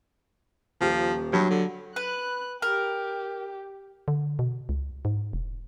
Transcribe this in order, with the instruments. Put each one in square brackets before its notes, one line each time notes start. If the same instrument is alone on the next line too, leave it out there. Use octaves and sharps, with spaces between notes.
[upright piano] D#1 G4 [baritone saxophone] F3
[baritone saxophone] G2 [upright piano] F#3
[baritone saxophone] D3
[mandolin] B4 [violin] F#6
[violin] G4 [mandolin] A#4
[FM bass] D3
B2
C#2
G#2
E1